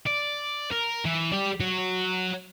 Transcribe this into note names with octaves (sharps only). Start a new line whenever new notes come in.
D5
A#4
E3
G4 D5
F#4 C#5